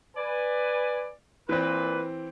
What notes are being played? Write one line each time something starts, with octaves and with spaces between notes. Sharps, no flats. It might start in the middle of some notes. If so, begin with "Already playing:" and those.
B4 D5 G#5
A#2 E3 C4 B4